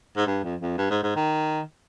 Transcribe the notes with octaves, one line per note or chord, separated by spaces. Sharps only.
G#2
G2
F2
F2
G2
G#2
G#2
D#3